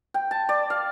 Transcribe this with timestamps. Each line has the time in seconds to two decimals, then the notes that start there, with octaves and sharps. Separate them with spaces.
0.14 G5
0.31 A5
0.49 D5
0.70 F5